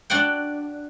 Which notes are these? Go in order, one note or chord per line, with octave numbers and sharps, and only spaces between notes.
D4 F#4 D5 F#5 G5